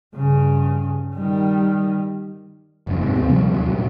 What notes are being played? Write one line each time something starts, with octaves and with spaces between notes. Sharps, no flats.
G2 C#3
D#3 G3
F#1 F2
G#2 C3
D#2 C4
C3 F3 G3 A#3
D#2 F#3
C2 A#2